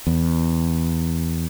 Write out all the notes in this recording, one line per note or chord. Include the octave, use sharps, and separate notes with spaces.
E2